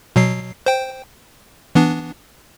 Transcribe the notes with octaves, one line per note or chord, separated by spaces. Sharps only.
B2 F#3 C7
C5 G5
E3 B3 D4